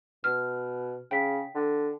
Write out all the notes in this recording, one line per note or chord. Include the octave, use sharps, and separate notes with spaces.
B2 F6
C#3 G5 B6
D3